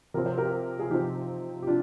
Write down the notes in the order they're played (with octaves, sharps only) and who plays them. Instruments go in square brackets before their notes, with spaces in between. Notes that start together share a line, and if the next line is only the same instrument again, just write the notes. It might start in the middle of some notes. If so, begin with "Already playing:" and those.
[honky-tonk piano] C3 F3 C4 [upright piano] A#4
[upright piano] C5
G4 A#4
G#4
[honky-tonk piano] C3 F3 C4 [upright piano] D#4 G4
[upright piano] G4
D4 F4